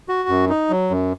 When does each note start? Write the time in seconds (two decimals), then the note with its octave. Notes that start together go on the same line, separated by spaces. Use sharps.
0.09 F#4
0.29 F#2
0.49 D#4
0.70 F#3
0.90 F#2